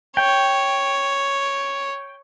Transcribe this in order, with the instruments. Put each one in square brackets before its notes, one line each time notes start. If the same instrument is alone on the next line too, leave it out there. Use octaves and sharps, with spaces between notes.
[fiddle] C#5 [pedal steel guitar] G5